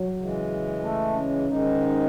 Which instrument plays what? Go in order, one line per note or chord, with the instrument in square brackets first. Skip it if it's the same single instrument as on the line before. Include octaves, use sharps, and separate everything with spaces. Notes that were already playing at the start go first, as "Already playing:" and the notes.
Already playing: [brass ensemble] F#3
[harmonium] C#3 E3 G#3
[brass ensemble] A3
C#4
[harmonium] G#2 D#3 G#3 D#4